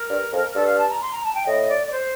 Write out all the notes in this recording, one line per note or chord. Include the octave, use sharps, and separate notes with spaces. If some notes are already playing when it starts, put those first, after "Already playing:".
Already playing: A#4
G2
F2
G2 A4
F5
A5
A#5
C6
A#5
A5
G5
A2 D#5
D5
D5
C5